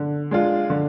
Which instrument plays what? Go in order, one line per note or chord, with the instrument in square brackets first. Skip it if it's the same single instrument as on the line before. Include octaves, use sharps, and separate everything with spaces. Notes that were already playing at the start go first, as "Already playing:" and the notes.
Already playing: [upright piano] D3
G#3 D4 F4
D3